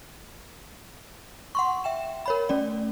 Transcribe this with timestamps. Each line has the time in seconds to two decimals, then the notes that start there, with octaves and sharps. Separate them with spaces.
1.55 F#5 C6 C#6
1.84 E5 G5 E7
2.26 A#4 C#5 B5
2.49 A3 C#4 D5